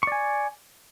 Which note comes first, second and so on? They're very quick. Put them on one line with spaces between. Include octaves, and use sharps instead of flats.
C#6 D5 G#5